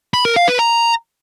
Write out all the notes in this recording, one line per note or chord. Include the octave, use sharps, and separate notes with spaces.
B5
A#4
F5
B4
A#5